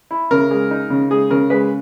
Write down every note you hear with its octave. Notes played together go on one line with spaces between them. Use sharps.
E4
C#3 A#4
G#3
D#4
C#3
G#3 G#4
C#3 A#4
G#3 B4